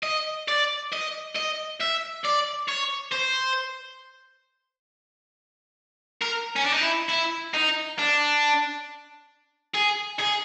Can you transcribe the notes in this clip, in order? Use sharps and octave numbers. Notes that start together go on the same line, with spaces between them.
D#5
D5
D#5
D#5
E5
D5
C#5
C5
A#4
C#4
D4
D#4
E4
E4
D#4
D4
G#4
G#4